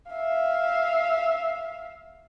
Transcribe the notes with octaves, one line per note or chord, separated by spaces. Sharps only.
E5 F5